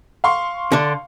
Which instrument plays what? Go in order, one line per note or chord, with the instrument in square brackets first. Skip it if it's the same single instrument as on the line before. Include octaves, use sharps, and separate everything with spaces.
[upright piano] F5 C6 C#6
[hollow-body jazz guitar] D3 D4